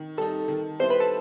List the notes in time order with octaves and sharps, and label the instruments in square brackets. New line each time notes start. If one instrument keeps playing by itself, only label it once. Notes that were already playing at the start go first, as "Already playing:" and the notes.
Already playing: [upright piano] D#3
[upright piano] G3 D#4 [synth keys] A4
[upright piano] D#3
[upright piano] G3 B3 E4 [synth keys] C5
[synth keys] B4
A4